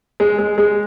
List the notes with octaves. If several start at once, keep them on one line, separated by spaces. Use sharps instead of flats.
G#3
G#3
G#3